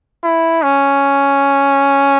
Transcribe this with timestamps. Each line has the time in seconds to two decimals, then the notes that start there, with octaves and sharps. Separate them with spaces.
0.24 E4
0.64 C#4